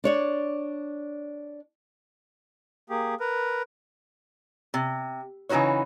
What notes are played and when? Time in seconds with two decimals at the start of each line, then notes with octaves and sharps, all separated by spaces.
0.04 D4 C#5 D5
2.90 A#3 G4 G#4
3.20 A#4 B4
4.74 C3
5.49 C#3 E3 D#4 F#4 B4 C#5